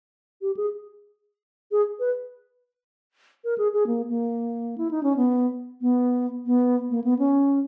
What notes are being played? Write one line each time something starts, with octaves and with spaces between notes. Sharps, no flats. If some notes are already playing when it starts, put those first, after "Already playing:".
G4
G#4
G#4
B4
A#4
G#4
G#4
A#3
A#3
E4
D#4
C#4
B3
B3
B3
A#3
B3
C#4